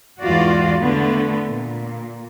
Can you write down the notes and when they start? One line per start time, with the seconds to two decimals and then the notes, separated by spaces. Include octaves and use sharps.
0.21 E2 G#2 E3 F4 F#4 D5
0.81 D3 A3 B3
1.47 A#2